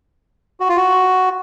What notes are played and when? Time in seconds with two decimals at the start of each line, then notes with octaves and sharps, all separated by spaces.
0.60 F#4
0.69 F4
0.77 F#4